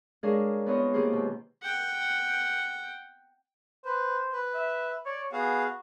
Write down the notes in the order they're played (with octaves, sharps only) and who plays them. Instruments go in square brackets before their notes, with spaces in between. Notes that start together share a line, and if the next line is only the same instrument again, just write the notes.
[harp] G#3 C#4 D4 G#4 A#4 F5
B3 C4 D#4 F4 C#5 D#5
D#3 A#3 C4 G4 G#4 C5
B2
[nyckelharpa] F#5 G5
[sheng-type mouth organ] B4 [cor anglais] C5
[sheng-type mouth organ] B4
[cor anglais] E5
[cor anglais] C#5 [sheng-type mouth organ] D5
[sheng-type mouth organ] B3 G#4 F5 [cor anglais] F#4